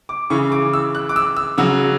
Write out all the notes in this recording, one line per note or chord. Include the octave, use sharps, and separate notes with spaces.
D6
C#3 E3 C#6
D6
E6
F#6
D6
E6
E6
C#3 F#3 E6